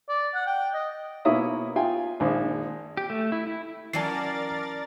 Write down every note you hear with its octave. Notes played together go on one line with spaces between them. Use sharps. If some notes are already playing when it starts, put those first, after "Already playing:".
D5
F#5
G5
D#5
B2 A#3 E4 C#5 E5 D#6
F4 G5 G#5
A#1 D#3 G#3 C5
G4
A3
E4
E4
E3 F#3 C#4 A#4 D5 A5 A6 C7